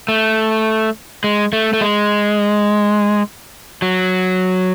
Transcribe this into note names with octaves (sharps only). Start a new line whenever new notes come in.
A3
G#3
A3
A3
G#3
F#3